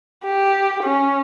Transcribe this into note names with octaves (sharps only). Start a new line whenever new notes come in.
G4
C#4